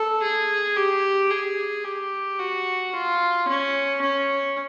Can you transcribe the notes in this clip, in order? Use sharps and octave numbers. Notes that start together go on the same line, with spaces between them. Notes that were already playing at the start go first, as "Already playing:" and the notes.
Already playing: A4
G#4
G4
G#4
G4
F#4
F4
C#4
C#4